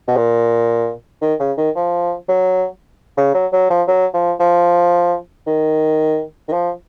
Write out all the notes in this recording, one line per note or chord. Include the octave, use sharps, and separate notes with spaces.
B2
A#2
D#3
C#3
D#3
F3
F#3
C#3
F#3
F#3
F3
F#3
F3
F3
D#3
D#3
F3